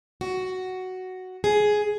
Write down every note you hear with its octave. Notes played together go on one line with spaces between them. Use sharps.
F#4
G#4